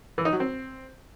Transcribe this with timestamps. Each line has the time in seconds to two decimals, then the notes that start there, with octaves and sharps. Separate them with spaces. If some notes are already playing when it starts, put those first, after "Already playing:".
0.18 E3
0.25 D#4
0.33 F#3
0.40 C4